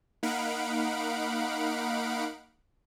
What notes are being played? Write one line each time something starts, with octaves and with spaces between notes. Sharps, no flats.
A#3 D#4 F5 F#5 B5 D7